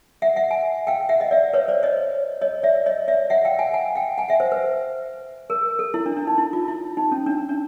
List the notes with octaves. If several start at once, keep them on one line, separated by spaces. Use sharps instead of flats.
E5 F#5
E5 F#5
F#5 G#5
F5 G5
E5 F#5
D#5 F5
D5 E5
B4 C#5
C5 D5
C#5 D#5
C#5 D#5
D5 E5
C#5 D#5
D5 E5
E5 F#5
F5 G5
F#5 G#5
F#5 G#5
F5 G5
F#5 G#5
E5 F#5
C5
B4
A#4
A4
E4
D4
D4
D#4
E4
F4
E4
D#4
C#4
D4
D4